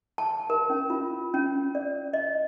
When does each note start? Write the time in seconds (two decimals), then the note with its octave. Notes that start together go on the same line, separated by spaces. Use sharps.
0.18 A5
0.50 A#4
0.70 C#4
0.90 F4
1.34 C#4
1.75 D5
2.13 D#5